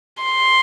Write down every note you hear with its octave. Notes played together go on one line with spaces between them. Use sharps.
C6